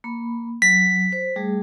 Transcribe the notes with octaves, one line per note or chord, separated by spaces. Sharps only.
A#3 B5
F#3 B6
C5
G3 A3 G#4